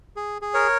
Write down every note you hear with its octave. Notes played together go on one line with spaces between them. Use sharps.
G#4
G#4
A#4 C#5